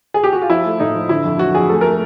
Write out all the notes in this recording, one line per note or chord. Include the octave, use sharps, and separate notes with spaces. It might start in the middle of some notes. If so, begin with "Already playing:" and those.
G#4
G4
F#4
F4
F3 E4
A3
A2 D#4
F3
D3 E4
F2
F#3 F#4
F2 G#4
A3 A4
A3 A#4